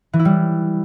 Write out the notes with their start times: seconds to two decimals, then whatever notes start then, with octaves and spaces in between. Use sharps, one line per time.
0.13 E3
0.19 E4
0.25 G3